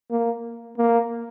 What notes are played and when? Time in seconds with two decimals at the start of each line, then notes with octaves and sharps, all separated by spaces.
0.11 A#3
0.78 A#3